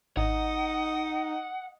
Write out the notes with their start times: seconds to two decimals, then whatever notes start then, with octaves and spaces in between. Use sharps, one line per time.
0.17 G#1 D#4 D#5 F#5